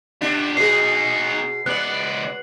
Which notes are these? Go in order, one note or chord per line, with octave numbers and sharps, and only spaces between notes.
B3 D4 G4
B2 B3 D#4 G#4 C7
C#2 B3 D5 F#6 F#7